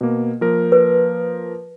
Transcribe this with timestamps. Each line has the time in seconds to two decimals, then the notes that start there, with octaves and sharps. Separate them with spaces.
0.01 B2 A#3
0.41 F3 A#3 A#4
0.72 B4